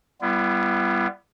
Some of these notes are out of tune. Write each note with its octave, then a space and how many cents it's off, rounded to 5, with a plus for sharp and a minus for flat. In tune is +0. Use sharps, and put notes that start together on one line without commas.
G3 +0 B3 +0 E4 +45